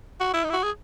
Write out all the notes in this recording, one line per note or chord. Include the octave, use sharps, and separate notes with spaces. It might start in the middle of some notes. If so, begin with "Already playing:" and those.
F#4
E4
D#4
E4
F#4
G#4